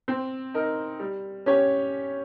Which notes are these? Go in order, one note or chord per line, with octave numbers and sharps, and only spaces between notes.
C4
D#4 A#4
G3
C#4 G4 C#5